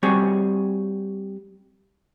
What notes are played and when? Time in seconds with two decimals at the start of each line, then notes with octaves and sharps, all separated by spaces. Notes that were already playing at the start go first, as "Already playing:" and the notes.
0.03 G3 C4 F#4 G#4 C#5